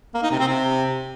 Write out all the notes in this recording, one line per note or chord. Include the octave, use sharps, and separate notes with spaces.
A#3
D#4
C3
C4
C3